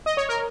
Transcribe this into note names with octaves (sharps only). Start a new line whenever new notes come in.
D#5
C#5
A#4